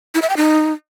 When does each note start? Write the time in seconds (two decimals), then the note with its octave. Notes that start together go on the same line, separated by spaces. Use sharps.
0.15 E4
0.22 E5
0.29 G5
0.37 D#4